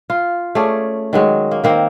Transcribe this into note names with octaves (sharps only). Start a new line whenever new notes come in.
F4
A3 C#4 G#4 D5
D#3 F#3 G#3
A#3
D#3 A#3 C4